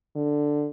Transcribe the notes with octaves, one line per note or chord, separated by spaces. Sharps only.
D3